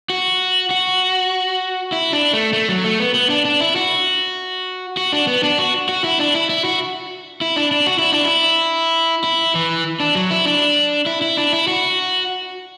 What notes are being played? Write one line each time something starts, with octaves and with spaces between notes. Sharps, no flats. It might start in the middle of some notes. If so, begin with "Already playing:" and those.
F#4
F#4
E4
D4
A3
A3
F#3
A3
B3
B3
D4
D4
E4
F#4
F#4
D4
B3
D4
F#4
F#4
E4
D4
E4
E4
F#4
E4
D4
D4
F#4
E4
D4
E4
E4
E3
D4
F#3
E4
D4
E4
E4
D4
E4
F#4